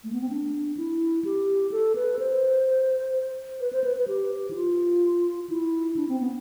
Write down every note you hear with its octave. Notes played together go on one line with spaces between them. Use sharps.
A3
B3
C4
D4
E4
G4
A4
B4
C5
B4
C5
B4
B4
G4
E4
F4
E4
D4
C4
B3